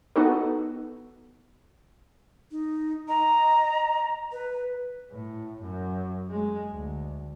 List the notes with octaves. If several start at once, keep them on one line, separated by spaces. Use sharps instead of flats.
B3 D#4 F#4 A4
D#4
D#5 A#5
B4
A2
F#2
G#3
D2